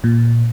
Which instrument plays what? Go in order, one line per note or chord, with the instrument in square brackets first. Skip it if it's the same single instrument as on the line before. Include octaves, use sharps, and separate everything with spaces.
[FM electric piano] A#2